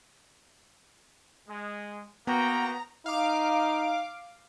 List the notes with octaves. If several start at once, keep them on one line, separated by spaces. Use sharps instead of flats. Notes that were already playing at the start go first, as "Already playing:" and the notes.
G#3
A#3 B3 F#4 G5 A#5
D#4 F5 D6